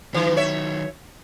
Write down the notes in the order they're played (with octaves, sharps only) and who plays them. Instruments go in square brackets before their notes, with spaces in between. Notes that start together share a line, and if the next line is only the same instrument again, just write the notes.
[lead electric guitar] D#3 F#3 [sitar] E3
[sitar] C#5 E5